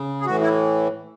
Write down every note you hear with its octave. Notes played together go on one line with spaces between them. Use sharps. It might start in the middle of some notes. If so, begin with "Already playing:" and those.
Already playing: C#3
G#4
A2 E3 F#4
E4